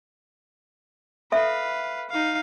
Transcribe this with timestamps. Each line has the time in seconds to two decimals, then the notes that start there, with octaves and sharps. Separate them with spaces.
1.32 A4 B4 E5 F5
2.09 D#4 F5